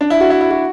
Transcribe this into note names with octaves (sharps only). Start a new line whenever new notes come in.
D4
E4
F#4
E4
E4
F#4